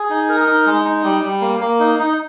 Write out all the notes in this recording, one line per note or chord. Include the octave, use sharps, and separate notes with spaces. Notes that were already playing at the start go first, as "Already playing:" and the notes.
Already playing: G#4
D#4
A#4
D#4
G#3
D#4
G3
G3
A#3
A#3
D#4
D#4